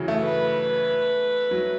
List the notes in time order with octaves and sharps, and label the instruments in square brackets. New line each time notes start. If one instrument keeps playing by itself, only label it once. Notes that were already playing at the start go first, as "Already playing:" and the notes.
Already playing: [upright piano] C#3 E3 F#3
A3
[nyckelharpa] B4
[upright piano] F#3